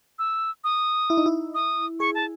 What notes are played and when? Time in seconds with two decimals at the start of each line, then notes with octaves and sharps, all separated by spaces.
0.19 E6
0.64 D#6
1.10 E4
1.17 D#4
1.26 E4
1.54 D#6
2.00 G#4 C#6
2.15 A5